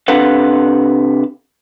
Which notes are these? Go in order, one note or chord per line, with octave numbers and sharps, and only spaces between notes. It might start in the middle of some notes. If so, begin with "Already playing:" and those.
C3 D4 A4 B4 F5 F#5